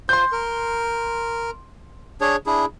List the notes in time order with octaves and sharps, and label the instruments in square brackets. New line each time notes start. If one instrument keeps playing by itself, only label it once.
[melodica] F4 C5 [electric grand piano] C6 G6
[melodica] A#4
D4 G#4 C#5
D4 E4 G#4